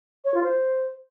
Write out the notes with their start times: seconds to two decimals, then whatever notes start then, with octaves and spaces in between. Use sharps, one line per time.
0.25 C#5
0.34 F4
0.44 C5